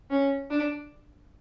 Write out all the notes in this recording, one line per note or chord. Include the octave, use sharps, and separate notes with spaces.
C#4
D4